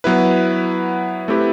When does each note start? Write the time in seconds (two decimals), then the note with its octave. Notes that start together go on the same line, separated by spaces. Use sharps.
0.04 F#3 B3 E4 B4
1.28 A3 C4 E4 G4 B4